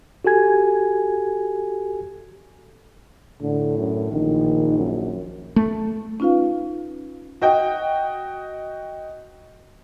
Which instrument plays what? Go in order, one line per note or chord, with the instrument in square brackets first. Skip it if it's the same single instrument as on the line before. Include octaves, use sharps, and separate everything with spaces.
[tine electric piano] F#4 G4 A4 G#5 G#6
[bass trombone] A2 [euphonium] D3
[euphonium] F#2
[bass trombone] A#1 [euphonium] D#3
[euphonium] F#2
[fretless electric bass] A3
[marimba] C#4 D#4 F4 B4 F5
[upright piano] F#4 D#5 G5